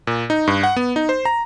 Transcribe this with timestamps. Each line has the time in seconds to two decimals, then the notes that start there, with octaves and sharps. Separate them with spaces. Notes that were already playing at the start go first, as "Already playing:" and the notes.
0.07 A#2
0.30 D#4
0.47 G2
0.63 F#5
0.76 B3
0.96 D#4
1.09 C5
1.25 A#5